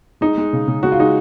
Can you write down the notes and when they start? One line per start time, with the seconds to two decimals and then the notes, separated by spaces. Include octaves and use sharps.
0.21 G#3 D#4
0.38 G#3
0.53 C#3
0.68 C#3
0.83 G#3 F#4
0.92 F4
0.99 G#3 D#4